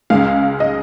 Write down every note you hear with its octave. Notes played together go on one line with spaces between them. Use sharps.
C#2 C#3 G#3 F5
D#5